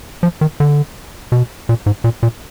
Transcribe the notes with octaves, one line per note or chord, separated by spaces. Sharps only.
F3
D#3
D3
B2
A#2
G#2
A#2
A#2